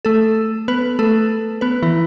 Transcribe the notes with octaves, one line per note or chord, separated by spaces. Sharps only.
A3 A4
B3 B4
A3 A4
B3 B4
E3 E4